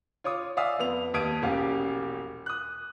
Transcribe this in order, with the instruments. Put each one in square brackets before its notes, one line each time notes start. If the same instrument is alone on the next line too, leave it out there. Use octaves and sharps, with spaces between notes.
[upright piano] F4 C#5 D6 D#6
D5 E5 F5 G#5 D#6 E6
F2 B3 F7
D#2 A5 D#6 G#6 D7 D#7
E1 A#1 C#4 G4 F5
D#6 F#6